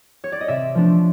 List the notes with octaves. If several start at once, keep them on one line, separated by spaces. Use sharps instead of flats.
C#5
D5
D#5
C3 D5 E5
F3 A3 D4